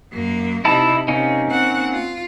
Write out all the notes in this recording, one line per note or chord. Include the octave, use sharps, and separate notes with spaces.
F#2 A#3
C3 D#4 E4 A5
C3 A#3 C#4 D#4
C4 F#5
F4